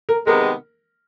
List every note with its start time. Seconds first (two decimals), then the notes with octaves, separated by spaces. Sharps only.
0.09 A#4
0.27 C3 D#3 G#3 B3 A#4